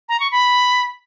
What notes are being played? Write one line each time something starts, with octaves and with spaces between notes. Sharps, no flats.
A#5
C#6
B5